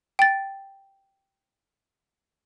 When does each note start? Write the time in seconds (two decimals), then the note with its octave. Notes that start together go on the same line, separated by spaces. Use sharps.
0.19 G5 A6